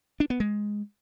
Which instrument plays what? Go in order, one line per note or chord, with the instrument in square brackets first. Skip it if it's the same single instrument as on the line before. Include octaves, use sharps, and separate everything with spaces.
[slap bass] D4
B3
G#3